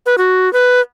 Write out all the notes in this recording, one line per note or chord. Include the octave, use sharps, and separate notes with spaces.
B4
F#4
B4